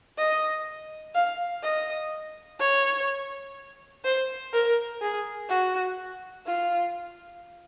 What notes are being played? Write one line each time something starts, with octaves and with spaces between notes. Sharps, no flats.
D#5
F5
D#5
C#5
C5
A#4
G#4
F#4
F4